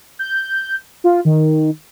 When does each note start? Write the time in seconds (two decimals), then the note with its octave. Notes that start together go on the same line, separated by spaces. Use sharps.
0.19 G6
1.04 F4
1.25 D#3